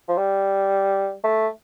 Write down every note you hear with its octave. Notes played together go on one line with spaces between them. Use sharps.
F3
G3
A3